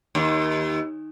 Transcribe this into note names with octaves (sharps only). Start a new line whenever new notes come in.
D#2